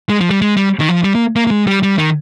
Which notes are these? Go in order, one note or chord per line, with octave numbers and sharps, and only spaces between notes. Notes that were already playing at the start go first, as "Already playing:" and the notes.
G#3
F3
G3
G#3
G3
D#3
F3
G3
A#3
A#3
A#3
G#3
G3
G3
D#3